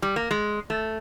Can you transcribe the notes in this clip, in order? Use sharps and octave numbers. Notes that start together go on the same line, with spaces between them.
G3
A#3
G#3
A3